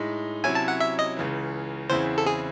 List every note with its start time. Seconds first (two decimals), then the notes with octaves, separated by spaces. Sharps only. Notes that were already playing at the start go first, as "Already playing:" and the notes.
Already playing: A2 G#3 D#4
0.44 C3 F#3 C#4 E4 G#5
0.55 A5
0.68 F#5
0.80 E5
0.99 D#5
1.17 C#2 C#3 E3
1.90 E2 C#3 E3 C4 E4 C5
2.18 A4
2.26 G#4